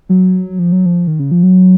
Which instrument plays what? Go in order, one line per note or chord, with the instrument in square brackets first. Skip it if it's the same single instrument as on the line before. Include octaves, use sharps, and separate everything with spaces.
[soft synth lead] F#3
F3
F#3
F3
D#3
C#3
F3
F#3